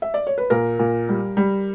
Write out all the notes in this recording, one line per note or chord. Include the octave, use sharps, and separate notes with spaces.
E5
D5
C#5
B4
A#2 A#4
A#2
G3
G3